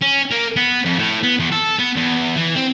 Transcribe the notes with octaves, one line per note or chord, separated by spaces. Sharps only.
C#4
A#3
B3
F2
A2
B3
E2
A4
B3
E2
E3
C4